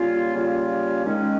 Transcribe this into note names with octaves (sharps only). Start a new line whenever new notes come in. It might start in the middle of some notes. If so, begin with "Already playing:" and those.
Already playing: C#3 G3 A#3 C#4 F4
C#3 G3 A#3 C#4 F4
D#3 G#3 C#4